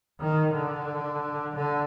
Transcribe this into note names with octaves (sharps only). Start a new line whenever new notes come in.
D#3
D3
D3